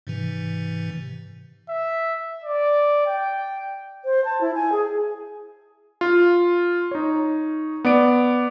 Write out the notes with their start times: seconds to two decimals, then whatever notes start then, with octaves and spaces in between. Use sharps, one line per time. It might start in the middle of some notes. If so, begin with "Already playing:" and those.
0.07 G#2 C3 E3
1.69 E5
2.44 D5
3.07 G5
4.05 C5
4.25 A5
4.41 E4
4.55 G#5
4.72 G#4
6.01 F4
6.91 D#4 C#5
7.85 B3 D5 D7